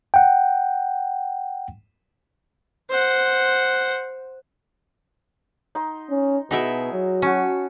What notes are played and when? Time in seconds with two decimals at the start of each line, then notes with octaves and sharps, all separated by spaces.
0.14 F#5 G5
2.90 C5 F#5
5.75 D#4 C6
6.10 C#4
6.51 B2 D#4 E4 F#4 G#4 E5
6.92 F#3
7.22 C#4 F#4 A5